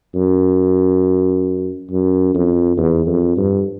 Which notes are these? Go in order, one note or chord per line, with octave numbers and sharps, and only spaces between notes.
F#2
F#2
F2
E2
F2
G2